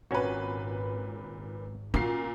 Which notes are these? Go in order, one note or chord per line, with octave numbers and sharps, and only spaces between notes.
G#1 A#2 C4 C#4 F#4 B4
A#2 C#4 F4 F#4 C7